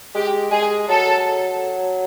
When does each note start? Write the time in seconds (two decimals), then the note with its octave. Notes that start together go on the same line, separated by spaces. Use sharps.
0.14 G#3 G4
0.51 G#3 G#4
0.88 F#3 A4